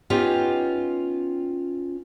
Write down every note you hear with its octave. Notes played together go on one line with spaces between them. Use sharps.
B3 C#4 D#4 F4 G4